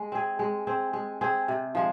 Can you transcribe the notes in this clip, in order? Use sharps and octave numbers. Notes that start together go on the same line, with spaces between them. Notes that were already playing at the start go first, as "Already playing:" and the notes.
Already playing: G#3
C4 G#4
G#3
C4 G#4
G#3
C4 G#4
C3
F3 G#3